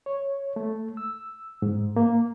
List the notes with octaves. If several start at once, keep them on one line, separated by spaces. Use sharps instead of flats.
C#5
A3
E6
G#2
A#3